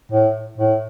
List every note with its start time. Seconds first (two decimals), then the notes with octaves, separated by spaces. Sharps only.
0.12 A2
0.58 A2